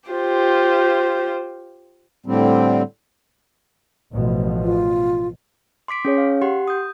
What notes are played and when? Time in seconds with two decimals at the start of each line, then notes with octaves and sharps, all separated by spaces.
0.10 F4 G4 C5
2.26 A2 D3 G3 C4
4.13 A1 B2 F3
4.64 F4
5.88 C6 D6 B6 D7
6.05 C#4 G#4 C#5
6.18 F5
6.41 G4 F#5 C6
6.68 D#6 G6